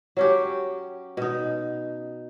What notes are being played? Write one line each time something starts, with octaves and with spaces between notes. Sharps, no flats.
F#3 C#4 G4
B2 D#4